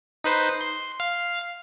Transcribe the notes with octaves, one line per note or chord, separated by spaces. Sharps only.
D#4 B4 C5
C6
F5